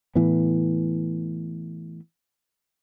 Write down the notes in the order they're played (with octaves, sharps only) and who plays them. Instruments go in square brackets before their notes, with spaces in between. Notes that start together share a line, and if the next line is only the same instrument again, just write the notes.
[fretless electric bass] A2 E3 B3